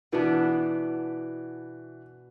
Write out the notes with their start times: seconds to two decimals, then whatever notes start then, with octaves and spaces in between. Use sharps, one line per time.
0.12 B2 E3 B3 D4